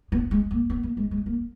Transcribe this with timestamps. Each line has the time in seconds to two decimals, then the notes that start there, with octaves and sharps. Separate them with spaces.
0.12 B3
0.31 G#3
0.51 A#3
0.70 B3
0.83 A#3
0.97 G#3
1.11 G#3
1.26 A#3